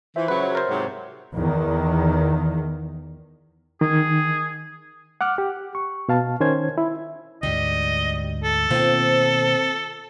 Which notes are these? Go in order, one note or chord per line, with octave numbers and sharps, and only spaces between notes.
E3 F4 C5 E5
C#3 F#3 B4
C#5 E5
A#4 C5 A6
G#2 C3 F#3
E2 D#3
D#3 G#4
F#5 D6 F6 F#6
G4
C#6
B2 F5 A5
D#3 C#4 C5 G#6
E4
D2 G#2 G3 D#5
A4
B2 D#3 A#3 C4 F4